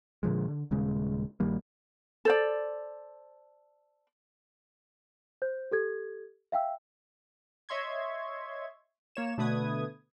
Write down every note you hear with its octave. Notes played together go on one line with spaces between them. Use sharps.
A#2 D3 F3 G#3
D3
D#1 C#3 G#3
A#1 D#3 G3 A#3
A4 C5 D5
C5 G6
G4 A4 G#6
E5 F5 G5 E6
C#5 D#5 E5 C6 C#6 G#6
A#3 C#5 E7
B2 D3 A3 B4 D#6 G#6